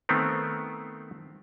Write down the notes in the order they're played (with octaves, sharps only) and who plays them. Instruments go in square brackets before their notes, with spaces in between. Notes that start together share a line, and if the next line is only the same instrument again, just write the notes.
[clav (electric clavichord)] D#3 A3 B3 C4